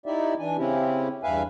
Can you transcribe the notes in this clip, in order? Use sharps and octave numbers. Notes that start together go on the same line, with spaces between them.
D#4 E4 G4 D5 E5
E3 D4 G#5
C#3 C4 C#4 E4 G4
E2 G2 B4 E5 F5 G#5